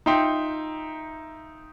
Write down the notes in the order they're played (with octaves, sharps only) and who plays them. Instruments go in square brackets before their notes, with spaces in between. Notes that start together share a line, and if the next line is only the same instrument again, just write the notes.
[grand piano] D#4 F4 E5 G5 C6